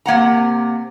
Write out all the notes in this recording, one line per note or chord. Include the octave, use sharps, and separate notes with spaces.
C3 A#3 F#5 A#5